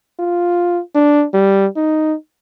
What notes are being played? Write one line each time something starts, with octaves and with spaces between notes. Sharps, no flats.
F4
D4
G3
D#4